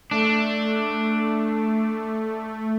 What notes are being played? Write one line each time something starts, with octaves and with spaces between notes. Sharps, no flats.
A3 D4